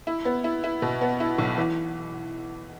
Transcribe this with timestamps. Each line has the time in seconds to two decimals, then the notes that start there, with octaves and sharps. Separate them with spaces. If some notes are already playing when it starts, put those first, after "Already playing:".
0.07 E4
0.25 B3
0.44 E4
0.64 E4
0.82 B2
1.01 B3
1.20 E4
1.38 B1
1.58 E3